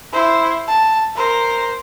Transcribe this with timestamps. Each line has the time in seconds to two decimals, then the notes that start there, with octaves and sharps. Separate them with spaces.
0.13 E4 C5
0.68 A5
1.16 A#4 C5